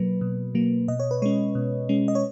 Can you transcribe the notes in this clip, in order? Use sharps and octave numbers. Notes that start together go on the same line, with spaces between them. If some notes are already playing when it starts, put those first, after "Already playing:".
Already playing: B2 F#3 A#3 B4
B2
F#3 A#3
B2 D#5
C#5
B4
G#3 C#4 C#5
B2
G#3 C#4
D#5
C#5